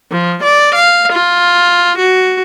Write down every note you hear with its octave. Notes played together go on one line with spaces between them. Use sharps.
F3
D5
F5
F4
F#4